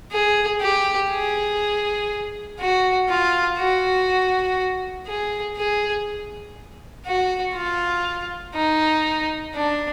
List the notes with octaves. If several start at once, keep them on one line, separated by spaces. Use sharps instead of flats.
G#4
G4
G#4
F#4
F4
F#4
G#4
G#4
F#4
F4
D#4
D4